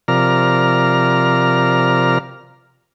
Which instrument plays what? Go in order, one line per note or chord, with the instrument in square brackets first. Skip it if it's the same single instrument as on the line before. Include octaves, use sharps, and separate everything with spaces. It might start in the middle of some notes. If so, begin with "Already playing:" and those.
[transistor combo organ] C3 F3 A#4 D5 A#5 F6